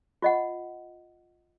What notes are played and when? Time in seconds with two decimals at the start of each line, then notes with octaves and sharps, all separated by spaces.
0.22 F4 D#5 F#5